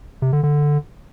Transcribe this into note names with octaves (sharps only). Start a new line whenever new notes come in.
C3
D3
D3